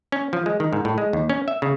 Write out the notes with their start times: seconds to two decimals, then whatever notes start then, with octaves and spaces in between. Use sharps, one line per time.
0.12 C#4
0.33 F3
0.46 G#3
0.60 D#3
0.73 G#2
0.85 A2
0.98 G#3
1.13 D#2
1.29 C#4
1.48 E5
1.62 C#3